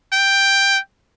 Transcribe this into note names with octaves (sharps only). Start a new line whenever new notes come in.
G5